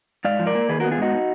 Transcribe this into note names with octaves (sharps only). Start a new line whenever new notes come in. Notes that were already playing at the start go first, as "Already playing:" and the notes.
G#2 D5 F5
F3
A#4 D5
A#3
D#3 G#4 B4
B3 F#4 A#4
F4 G#4
G#2 D#4 F#4